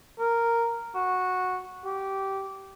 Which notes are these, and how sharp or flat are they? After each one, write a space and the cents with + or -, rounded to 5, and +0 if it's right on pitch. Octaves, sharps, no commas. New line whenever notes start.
A#4 -5
F#4 -10
G4 -15